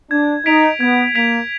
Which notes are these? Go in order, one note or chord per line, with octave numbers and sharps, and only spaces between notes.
D4 G#6
D#4 B6 D7 F7
B3 G#6
A#3 B6 D7 F7